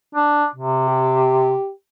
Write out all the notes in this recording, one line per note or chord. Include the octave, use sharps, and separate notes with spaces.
D4
C3
G4